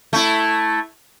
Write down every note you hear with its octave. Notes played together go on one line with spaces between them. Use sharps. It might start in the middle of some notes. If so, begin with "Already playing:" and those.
A3 E4